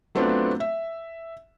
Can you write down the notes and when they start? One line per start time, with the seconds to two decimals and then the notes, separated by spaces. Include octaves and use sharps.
0.15 F#3 A3 B3 C4 D4 F4
0.60 E5